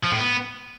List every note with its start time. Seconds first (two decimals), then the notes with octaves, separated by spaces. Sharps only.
0.04 F3
0.12 A2
0.20 B3